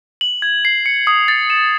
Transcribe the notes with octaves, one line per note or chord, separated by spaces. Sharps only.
F#7
G#6
C7
C#7
D#6
A6
E7